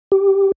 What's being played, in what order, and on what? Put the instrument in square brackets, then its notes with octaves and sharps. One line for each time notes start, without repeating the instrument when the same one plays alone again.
[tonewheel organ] G4